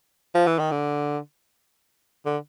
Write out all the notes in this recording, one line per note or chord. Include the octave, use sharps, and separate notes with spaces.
F3
E3
D#3
D3
D3